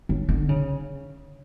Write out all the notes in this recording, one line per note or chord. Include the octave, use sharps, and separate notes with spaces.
F#3
D3
C#3